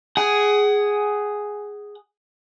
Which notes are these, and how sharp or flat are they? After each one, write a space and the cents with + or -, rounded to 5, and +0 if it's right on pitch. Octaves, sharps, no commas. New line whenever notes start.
G#4 +0 F#5 +30